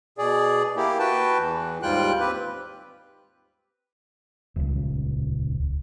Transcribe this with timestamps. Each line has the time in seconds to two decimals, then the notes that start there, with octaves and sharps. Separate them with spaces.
0.18 B2 G#4 D5
0.76 A#3 E4 G4
0.99 F#4 B4 G5 A5
1.38 E2 E3
1.83 D#2 G#2 G3 F4 G5 F#6
2.20 C4 G4 B4
4.56 D#1 C#2